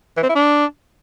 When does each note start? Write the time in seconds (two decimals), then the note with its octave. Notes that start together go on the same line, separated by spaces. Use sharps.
0.17 E3
0.23 C4
0.29 E4
0.35 D4